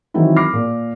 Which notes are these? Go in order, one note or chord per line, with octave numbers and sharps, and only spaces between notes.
D#3 E3 F#3 C4 D#4 E4
B5 D6 F6 A#6 C7
A#2